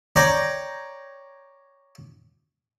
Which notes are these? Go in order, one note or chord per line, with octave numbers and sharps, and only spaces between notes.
C#5 D5 G5 A#5